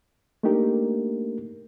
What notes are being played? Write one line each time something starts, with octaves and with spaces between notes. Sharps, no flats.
A3 A#3 D4 D#4 G4 A#4